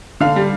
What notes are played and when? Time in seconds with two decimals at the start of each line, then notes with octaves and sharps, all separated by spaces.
0.21 D3 F5
0.36 G3